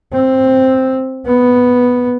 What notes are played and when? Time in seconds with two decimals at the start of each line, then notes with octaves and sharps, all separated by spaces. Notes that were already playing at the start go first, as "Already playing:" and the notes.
0.13 C4
1.26 B3